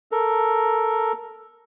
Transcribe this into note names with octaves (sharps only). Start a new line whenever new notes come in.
A4 A#4